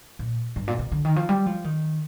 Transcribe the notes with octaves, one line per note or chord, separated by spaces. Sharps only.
A#2
G2
A#2
C3
D3
D#3
F3
G3
F3
D#3